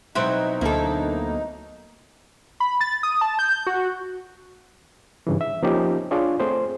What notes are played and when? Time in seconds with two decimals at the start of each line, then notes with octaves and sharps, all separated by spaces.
0.15 B2 F#3 C4 D#4 E4
0.61 D2 A#3 E4 A4
2.60 B5
2.81 A6
3.03 D#6
3.21 A5
3.39 G6
3.67 F#4
5.27 G2 C#3 E3
5.41 E5
5.63 F3 A#3 C4 C#4 D#4 G4
6.11 D4 F4 G#4 C#5
6.40 A3 C4 G#4 C5